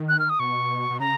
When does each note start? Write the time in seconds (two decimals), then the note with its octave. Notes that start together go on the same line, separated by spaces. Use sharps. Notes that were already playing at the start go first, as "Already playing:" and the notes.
Already playing: D#3
0.09 F#6
0.19 F6
0.30 D#6
0.39 B2 C#6
0.90 B2
1.00 C#3 A#5